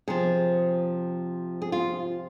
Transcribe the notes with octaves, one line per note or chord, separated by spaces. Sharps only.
C3 F3 G#4
G#4
F4